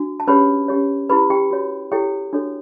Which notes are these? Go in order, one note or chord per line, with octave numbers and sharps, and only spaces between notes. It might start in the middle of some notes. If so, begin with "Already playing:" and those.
Already playing: D4 F#4
A5
C#4 G4 B4 C#5 B5
C#4 G4 C#5
E4 G4 B4 B5
G4 G5
F#4 C#5
E4 G4 A4 C#5 G5
D4 F#4 A4 C#5